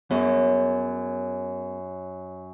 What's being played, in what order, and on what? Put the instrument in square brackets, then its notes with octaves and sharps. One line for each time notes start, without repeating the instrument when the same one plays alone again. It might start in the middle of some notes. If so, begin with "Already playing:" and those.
[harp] F#2 [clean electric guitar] B3 G#4 A#4 [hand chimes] C#5